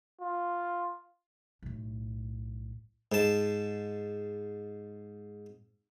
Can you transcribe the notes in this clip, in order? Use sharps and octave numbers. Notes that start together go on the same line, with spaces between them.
F4
B1 A2
G#2 A5